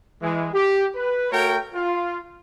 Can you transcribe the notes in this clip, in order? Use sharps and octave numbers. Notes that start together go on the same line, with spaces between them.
E3 G#3
G4
B4
A3 F#4 A#4 C#5 G5
F4